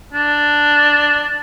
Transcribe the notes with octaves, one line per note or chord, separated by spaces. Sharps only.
D4